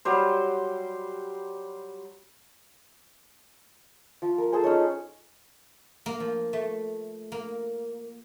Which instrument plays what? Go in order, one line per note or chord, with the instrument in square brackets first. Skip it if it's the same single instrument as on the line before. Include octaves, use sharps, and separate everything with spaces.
[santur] F#3 G3 C5
F3
A#4
G#4 A4 C5 G#5
C#4 D#4 C#5
[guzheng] A#3
F3
A3
A#3